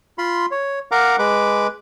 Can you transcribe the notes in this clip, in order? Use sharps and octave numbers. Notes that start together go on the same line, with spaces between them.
F4 B5 C6
C#5
A#4 F5 F#5 A#5 D6
G#3 B4 D6